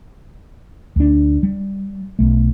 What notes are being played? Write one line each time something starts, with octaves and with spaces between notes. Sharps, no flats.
D2 D4
G3
B1 A3